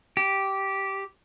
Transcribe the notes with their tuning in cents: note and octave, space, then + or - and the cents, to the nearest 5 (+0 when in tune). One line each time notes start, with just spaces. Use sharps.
G4 -10